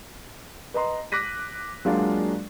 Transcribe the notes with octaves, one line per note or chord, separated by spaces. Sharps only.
B4 D#5 A#5 C6
D6 F#6 A#6 B6 D#7
F#3 G#3 A#3 D4 F4 D5